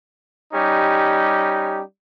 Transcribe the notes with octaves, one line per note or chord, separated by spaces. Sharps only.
G3 C#4 D#4 G4